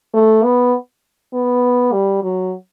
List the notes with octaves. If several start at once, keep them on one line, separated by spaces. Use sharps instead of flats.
A3
B3
B3
G3
F#3